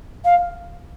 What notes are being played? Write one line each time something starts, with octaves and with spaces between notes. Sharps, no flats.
F5